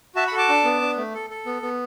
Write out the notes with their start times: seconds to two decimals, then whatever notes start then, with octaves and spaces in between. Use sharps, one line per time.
0.15 F#4 E5 A5
0.27 F#5 B5
0.32 A4
0.37 A5 D6
0.49 D4
0.64 B3
0.82 D4
0.97 A3
1.14 A4
1.30 A4
1.46 B3
1.62 B3